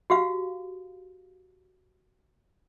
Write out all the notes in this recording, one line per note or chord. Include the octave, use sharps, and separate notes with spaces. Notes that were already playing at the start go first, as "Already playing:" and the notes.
F#4 G4 F5